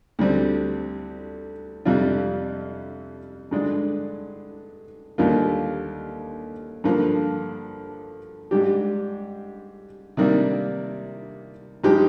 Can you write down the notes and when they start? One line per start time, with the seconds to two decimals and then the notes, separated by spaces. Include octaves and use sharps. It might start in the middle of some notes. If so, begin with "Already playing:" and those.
0.19 D2 D3 G3 C4
1.85 F2 C3 G3 D4 F4
3.51 G2 D3 G#3 D4
5.18 D#2 D3 G3 A#3 F4
6.84 G2 D3 F3 A#3
8.51 G#2 G3 D4 G4
10.17 C3 D#3 G3 A#3 D4
11.84 G2 F3 G#3 D#4 G4